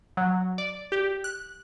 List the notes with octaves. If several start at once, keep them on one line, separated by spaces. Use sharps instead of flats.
F#3
D5
G4
F#6